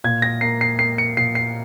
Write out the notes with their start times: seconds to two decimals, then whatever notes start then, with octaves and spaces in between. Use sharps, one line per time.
0.04 A#2 G#6
0.22 A#6
0.41 A#3 C7
0.61 C7
0.79 A#3 C7
0.98 C#7
1.17 A#2 C7
1.35 C7